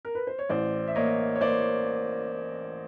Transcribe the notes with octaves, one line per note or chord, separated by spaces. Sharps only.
A#4
B4
C5
C#5
A1 C5 D5
E5
A#3 C#5 D#5
C#5
A#3 C5 D5